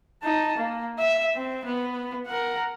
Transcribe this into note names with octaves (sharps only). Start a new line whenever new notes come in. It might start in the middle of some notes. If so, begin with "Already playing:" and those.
D#4 A5
A#3
E5
C4
B3
A#4 F#5